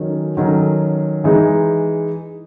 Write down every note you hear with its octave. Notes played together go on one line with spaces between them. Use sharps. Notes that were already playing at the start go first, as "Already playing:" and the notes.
Already playing: D#3 F#3 C#4 F#4 A4
D#3 F#3 C#4 F#4 A4
E3 G#3 D#4